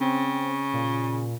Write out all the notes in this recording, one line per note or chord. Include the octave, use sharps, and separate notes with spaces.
C#3 C4
A#2